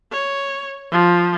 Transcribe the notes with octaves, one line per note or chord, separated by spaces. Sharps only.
C#5
F3